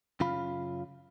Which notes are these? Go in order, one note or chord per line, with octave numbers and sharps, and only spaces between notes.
F#2 C#3 F4 F5 B5